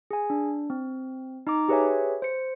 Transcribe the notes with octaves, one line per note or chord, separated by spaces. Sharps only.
G#4 G#5
D4
C4
D#4 A#5 D6
G4 G#4 B4 C#5 E5 G#5
C5 C#7